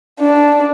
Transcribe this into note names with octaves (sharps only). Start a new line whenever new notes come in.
D4